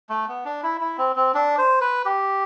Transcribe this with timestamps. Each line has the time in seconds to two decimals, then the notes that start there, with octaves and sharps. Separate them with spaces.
0.10 A3
0.28 B3
0.45 D4
0.63 E4
0.81 E4
0.98 C4
1.16 C4
1.34 D4
1.58 C5
1.81 B4
2.05 G4